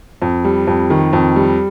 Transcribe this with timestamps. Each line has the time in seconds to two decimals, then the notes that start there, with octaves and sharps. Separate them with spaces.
0.22 F2
0.44 G3
0.67 F2
0.90 D#3
1.13 F2
1.36 G3